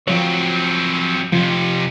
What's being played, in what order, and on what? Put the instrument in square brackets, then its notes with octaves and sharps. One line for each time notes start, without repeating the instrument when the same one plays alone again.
[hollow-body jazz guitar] F3 C#5 [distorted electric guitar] F#3 C4
[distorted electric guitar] F2 C3 [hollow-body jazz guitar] F3